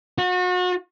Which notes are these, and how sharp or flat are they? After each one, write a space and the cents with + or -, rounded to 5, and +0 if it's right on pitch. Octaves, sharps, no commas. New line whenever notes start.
F#4 -35